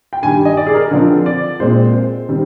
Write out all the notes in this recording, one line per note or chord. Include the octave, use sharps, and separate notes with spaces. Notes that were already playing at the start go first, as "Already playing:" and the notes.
G5
G2 D#3 G3 G#5
D#5
D5
G#4
A#4
D3 F3 C4
D5
A#2 G#3 C4 C5
C5
D#3 G3 C4